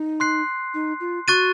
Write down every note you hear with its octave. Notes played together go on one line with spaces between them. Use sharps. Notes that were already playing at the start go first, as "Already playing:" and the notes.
Already playing: D#4
C6 F#6 C7
D#4
F4
F#4 C#6 F#6 A6 D#7